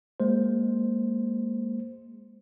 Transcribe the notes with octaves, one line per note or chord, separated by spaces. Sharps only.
G#3 A#3 C5